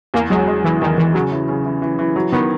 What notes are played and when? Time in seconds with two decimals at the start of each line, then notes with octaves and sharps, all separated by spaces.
0.14 E2 A#3
0.30 F#3 G#3
0.48 G#3
0.64 E2 E3
0.81 E2 D#3
0.98 E2 E3
1.14 C#3 F#3
1.32 E3
1.48 C#3
1.65 E3
1.82 E3
1.99 E3
2.16 F#3
2.32 D#3 B3